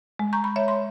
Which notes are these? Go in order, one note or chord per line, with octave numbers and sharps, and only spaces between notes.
G#3
A#5 C#6 G6
B5
C#5 E5
C6